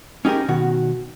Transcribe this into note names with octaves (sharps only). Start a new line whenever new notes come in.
C#4 D#4 G4 G#4 A#4
B2 D#3 F#4